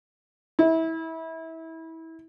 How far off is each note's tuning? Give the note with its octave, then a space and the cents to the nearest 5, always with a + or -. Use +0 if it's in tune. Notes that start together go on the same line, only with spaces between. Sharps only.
E4 -25